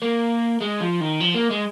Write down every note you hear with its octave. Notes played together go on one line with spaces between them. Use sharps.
A#3
G#3
F3
D#3
F3
A#3
G#3